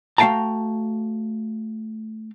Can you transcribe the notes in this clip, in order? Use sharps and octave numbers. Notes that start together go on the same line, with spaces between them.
A3 F#4 F5 G5 A5 A#5